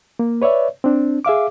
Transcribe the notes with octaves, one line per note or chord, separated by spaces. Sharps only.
A#3
B4 C#5 D5 E5
C4 D4
G#4 E5 F5 D6